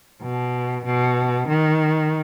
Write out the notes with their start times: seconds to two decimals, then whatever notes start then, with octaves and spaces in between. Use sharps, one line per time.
0.22 B2
0.85 B2
1.48 D#3